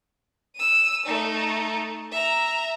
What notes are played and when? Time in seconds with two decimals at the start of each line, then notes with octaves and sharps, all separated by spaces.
0.56 E6 D#7
1.06 A3 D#4
2.11 E5 A#5